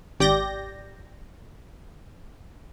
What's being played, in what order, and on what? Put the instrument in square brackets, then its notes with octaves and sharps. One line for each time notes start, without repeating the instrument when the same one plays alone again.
[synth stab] G#1 G4 D5 G6 A#6